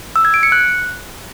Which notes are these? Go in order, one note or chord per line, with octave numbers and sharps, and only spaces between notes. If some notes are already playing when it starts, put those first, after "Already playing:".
E6
G#6
D7
C#7
F#6